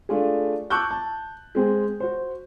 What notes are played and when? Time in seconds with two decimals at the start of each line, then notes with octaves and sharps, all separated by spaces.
0.09 A3 D4 F4 G#4
0.70 A5 C#6 D6 E6 F#6 G6
0.91 A5
1.55 G#3 C4 G#4
2.00 F#4 C5